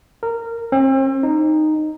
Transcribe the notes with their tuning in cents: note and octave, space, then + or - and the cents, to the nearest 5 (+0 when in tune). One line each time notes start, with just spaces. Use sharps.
A#4 -15
C4 +40
D#4 -10